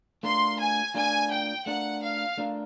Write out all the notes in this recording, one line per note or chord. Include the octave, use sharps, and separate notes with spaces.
A3 D4 F4 A#4 C6
G#5
A3 D4 F4 A#4 G#5
G5
A3 D4 F4 A#4 F#5
F5
A3 D4 F4 A#4